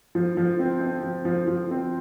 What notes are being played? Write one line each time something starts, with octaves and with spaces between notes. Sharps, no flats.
F3
F3
C4
C4
F3
F3
F3
C4